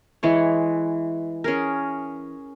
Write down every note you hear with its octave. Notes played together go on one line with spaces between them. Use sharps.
E3 G#3 C#5
C#4 G#4 A#4